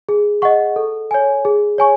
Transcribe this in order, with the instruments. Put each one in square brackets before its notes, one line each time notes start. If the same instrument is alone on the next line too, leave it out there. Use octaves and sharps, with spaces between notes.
[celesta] G#4
D#5 F#5 C#6
A4
C#5 G#5
G#4
C#5 G#5 C#6